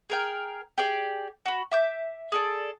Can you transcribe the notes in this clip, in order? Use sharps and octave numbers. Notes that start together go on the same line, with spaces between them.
G#4 A#4 G5
G4 G#4 D5
F#4 B5
E5 D6 G6
G#4 A4 D5